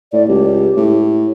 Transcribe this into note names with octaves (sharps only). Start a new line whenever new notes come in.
A2 D5
C#2 G4
A2